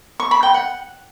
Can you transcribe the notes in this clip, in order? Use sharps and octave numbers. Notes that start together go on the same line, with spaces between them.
C#6
B5
G5
F#5